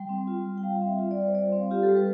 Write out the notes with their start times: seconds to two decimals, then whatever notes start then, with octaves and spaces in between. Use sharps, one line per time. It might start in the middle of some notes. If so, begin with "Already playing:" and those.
Already playing: G3 G5
0.09 C4
0.27 F4
0.46 G3
0.58 G5
0.63 G3 F5
0.81 C4
0.87 E5
0.99 F4
1.11 D5
1.17 G3
1.26 C5
1.35 G3 D5
1.52 C4
1.59 F5
1.71 F4 G4
1.83 A4
1.89 G3
1.97 B4